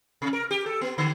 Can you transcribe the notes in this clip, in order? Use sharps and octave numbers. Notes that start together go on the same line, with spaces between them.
C3
A#4
G4
A4
B3
D3